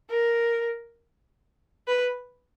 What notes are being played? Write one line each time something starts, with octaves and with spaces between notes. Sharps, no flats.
A#4
B4